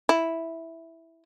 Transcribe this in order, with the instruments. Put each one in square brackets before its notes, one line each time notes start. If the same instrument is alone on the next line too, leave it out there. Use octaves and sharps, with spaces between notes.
[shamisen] E4